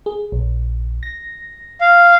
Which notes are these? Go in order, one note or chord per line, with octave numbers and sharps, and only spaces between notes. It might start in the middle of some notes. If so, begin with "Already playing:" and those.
G#4
A#1
A#6
F5